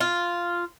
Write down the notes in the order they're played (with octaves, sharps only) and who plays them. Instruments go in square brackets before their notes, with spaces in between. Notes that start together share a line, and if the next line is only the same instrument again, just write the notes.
[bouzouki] F4